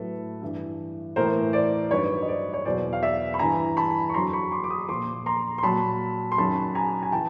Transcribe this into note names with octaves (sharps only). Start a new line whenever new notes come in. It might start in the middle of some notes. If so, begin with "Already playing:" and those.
Already playing: A2 F#3 A4 B4
G2 E3
A2 E3 A#4 C5
C5 D5
G2 D#3 F#3 B4 C#5
D#5
C5 D5
C#5
E2 B2 F#3 C5 D5
F5
D5 E5
B5
G2 E3 G#5 A#5
A5 B5
C#6
F2 D3 F#3 A#5 C6
B5 C#6
C6 D6
D6
C#6 D#6
A#2 F3 C6 D6
A#5 C6
C6
A#2 F#3 A5 B5
C6
F#2 D#3 F#3 A5 B5
G#5 A#5
G#5
E3 G5 A5